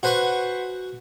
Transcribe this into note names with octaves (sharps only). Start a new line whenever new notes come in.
F#4 B4 C5 F#5 G#5 C#6